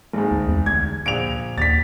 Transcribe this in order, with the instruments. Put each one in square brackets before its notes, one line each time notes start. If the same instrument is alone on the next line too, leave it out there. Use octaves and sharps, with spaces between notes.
[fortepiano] G#1 G#2
[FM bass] D2
E2
[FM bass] D2 [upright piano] G#6
[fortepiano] A#1 [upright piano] D7 F7
[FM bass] D#2 [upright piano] A6 B6